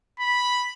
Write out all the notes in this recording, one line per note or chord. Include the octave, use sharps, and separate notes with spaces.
B5